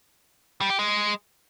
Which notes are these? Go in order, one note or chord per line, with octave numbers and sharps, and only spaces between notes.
G3
G4
G#3